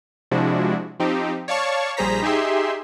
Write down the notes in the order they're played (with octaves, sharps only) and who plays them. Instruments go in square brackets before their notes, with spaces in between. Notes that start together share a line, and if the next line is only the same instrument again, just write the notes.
[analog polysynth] C3 F3 G#3 D4 E4 F#4
F3 C4 D#4 G4
C#5 D5 F5 A5 C#6
A#1 G3 G#4 C5 A#5 B6
D#4 G4 G#4 E5 C6